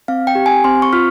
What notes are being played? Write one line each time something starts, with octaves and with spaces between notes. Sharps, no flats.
C4 F5
G5
G4
G#5
C4 C6
C#6
F4 F6